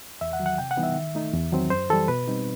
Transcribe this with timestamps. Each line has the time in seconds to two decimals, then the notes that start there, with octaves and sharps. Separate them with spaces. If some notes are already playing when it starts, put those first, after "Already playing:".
0.21 E2 E5
0.33 F#5
0.40 D#3 F#3
0.46 F#5
0.58 C3 G5
0.71 F#5
0.77 E3 G3 B3 D#4
0.83 E5
0.96 D#3
1.15 A3 D#4
1.33 E2
1.52 D#3 F#3 C4
1.70 F#2 C5
1.90 E3 G3 A4
2.08 B2 B4
2.28 G3 C4 D#4